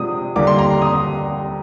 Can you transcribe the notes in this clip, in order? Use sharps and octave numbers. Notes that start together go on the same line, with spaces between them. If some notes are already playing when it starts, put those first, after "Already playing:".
Already playing: C3 F3 G#3 D4 D#6
D#2 D3 G3 A#3 D6
C6
A#5
C6
D#6